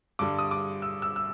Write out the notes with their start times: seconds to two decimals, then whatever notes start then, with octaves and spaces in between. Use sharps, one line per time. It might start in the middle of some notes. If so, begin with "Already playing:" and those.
0.19 G2 D3 G3 D6
0.39 D#6
0.51 D6
0.82 E6
1.02 E6
1.16 E6